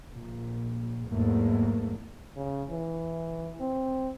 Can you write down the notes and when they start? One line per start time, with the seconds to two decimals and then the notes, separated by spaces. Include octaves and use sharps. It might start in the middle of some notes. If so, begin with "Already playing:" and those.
0.12 A#1 A#2
1.09 E2 G#2 F#3 A3 A#3
2.36 C#3
2.70 E3
3.60 C4